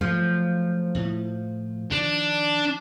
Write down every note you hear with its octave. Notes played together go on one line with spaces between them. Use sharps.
F3 F#3 A3
A2
D#3 D4